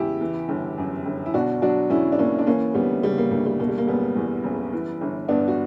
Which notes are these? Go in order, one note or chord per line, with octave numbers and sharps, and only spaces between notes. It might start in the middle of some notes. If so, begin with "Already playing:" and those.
Already playing: E2 C#3 E4 G4
E3
G1
F#2
G1
E4
B2 D4 F#4
F#3 D4 F#4
E2 C#4 E4
D4
F#1 A#3 C#4
D4
E3 A#3 C#4
D2 G3 B3
C#3 G3
A#3
D2 A#3
G3
B2 A#3
G3
A#3
F#1 G3 B3
E2
F#1
E3
G1
G2 B3 D4
F#4